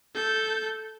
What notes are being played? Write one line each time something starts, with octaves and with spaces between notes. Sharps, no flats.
A4 G6